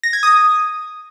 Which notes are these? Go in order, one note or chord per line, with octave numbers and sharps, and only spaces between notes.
A#6
G#6
D#6